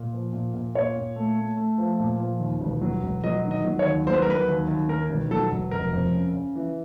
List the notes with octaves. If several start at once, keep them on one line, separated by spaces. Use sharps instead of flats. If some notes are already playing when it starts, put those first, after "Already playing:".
Already playing: A#2
F3
A#2
A#2
A#2 C#5
A#2
A3
A3
A3
F3
A#2
F3
D#2
E1
F#3
E1
F#3 D#5
D#3
D#5
F#3
C#5
D#2
F#3 C5
B4
A#4
F#3 B4
D#2
D#2
D#3 A#4
E1
F#3 A4
E1
F1 A#4
F2
C#3
C#3
E3